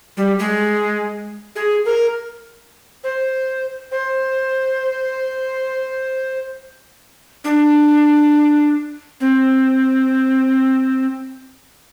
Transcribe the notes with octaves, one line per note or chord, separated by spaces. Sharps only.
G3
G#3
G#4
A#4
C5
C5
D4
C4